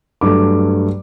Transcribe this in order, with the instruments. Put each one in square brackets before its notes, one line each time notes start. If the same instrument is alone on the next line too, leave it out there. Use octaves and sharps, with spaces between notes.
[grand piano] G2 F#3 A3 D6